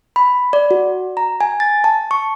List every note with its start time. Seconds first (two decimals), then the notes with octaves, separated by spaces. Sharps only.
0.16 B5
0.53 D5
0.71 F#4
1.17 A#5
1.41 G#5
1.60 A6
1.84 A5
2.11 C#6